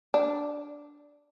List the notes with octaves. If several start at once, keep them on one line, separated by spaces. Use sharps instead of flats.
D4